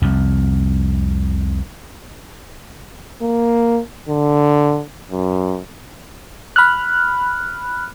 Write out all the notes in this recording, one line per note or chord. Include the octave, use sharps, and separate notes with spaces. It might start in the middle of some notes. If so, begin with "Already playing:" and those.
C2 F2
A#3
D3
F#2
B5 F6 F#6